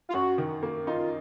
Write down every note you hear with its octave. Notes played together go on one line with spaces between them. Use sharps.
F4
F#2 F#4
D#3
A#3
D#4 F4